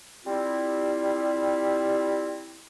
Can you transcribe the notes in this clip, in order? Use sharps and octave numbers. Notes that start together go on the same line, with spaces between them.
G3 C4 E4 F4 G4